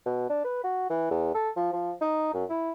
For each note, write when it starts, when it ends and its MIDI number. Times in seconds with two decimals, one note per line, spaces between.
0.06 0.26 47
0.29 0.41 62
0.45 0.60 71
0.64 0.85 66
0.90 1.06 52
1.11 1.32 40
1.34 1.50 69
1.56 1.70 53
1.73 1.92 53
2.01 2.32 63
2.34 2.45 42
2.50 2.72 64